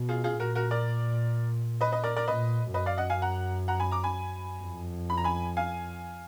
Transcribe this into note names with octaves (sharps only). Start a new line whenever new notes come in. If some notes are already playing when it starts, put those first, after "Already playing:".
Already playing: B2
F4 G#4
F4 G#4
A#2 F#4 A#4
F#4 A#4
A#4 D5
B4 D#5
B4 D#5
A#4 D5
A#4 D5
A#2 B4 D#5
F#2 B4 D#5
D5 F5
D#5 F#5
F5 G#5
F#5 A#5
F#5 A#5
G#5 B5
A#5 D6
G#5 B5
F2
B5
A#5
G#5 B5
F5 G#5